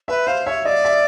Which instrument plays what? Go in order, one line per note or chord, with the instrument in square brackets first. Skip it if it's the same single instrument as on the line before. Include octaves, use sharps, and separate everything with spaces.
[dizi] B4 [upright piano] E5
[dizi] C5 [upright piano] F5
[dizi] C#5 [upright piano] E5
[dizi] D5 [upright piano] D#5
[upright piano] E5